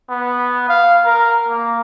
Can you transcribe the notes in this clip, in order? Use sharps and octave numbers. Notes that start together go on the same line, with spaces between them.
B3
F5
A#4
A#3